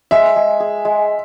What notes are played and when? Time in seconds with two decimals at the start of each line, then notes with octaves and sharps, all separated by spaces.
0.11 G#3 E5
0.36 G#3
0.60 G#4
0.85 G#3